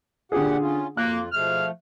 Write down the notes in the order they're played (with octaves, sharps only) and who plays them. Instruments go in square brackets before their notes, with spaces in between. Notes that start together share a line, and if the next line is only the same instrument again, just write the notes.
[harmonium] A#2 G4 F#5 [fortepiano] D3 G#4
[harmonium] C#4 F4
[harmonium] F2 F4 [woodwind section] A#3 [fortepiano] F#6
[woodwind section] B2 G#4 F6 [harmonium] F3 A3